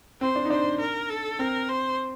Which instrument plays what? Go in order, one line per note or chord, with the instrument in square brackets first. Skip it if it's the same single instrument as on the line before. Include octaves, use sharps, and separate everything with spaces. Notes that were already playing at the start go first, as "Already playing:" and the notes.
[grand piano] C4 [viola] C5
[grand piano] D4
D#4
[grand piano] D4 [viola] C5
[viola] A#4
A4
[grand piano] C4 [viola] A#4
[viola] C5